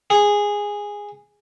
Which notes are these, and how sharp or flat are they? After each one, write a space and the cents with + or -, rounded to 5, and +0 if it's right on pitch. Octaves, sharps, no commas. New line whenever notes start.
G#4 -10